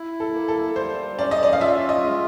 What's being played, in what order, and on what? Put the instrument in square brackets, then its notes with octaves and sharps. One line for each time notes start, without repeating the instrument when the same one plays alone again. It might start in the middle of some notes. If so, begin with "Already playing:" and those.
Already playing: [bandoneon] E4
[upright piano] A4
[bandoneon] A#3
[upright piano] A4
[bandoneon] G3 [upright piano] C5
[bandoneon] C#4 [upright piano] D5
[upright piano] D#5
D5
F5
[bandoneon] F4 [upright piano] E5
[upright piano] D#5
[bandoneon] G#3